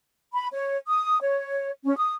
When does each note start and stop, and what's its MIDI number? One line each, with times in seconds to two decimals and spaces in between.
0.33 0.48 83
0.52 0.76 73
0.87 1.18 87
1.21 1.70 73
1.84 1.96 61
1.96 2.14 87